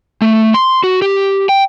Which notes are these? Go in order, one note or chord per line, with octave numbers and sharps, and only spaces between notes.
A3
C6
F#4
G4
G5